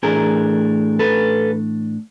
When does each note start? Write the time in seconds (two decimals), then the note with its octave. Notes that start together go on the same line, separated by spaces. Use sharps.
0.03 A2 E3 A3 D4 G#4 A#4
0.99 A4 B4